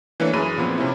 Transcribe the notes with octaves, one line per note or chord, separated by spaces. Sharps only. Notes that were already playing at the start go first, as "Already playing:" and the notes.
E3 A3 A#3 D4 B4 C#5
F#2 E3 G#4 B5 D#7
A#2 F3 B3 C4
C3 C#4 E4